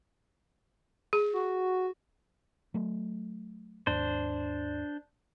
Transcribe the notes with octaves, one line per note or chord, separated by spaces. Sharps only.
G#4
F#4
F#3 A3
D#2 G#2 D4 C5